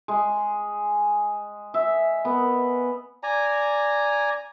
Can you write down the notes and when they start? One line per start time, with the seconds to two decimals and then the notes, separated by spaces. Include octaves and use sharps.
0.08 G#3
1.74 E5
2.25 B3
3.23 D5 G#5 A#5